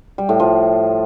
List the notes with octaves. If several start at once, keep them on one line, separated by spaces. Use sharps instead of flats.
G3
A2
F3